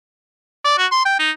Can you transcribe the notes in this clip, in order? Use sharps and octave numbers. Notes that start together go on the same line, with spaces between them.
D5
F#4
C6
G5
D#4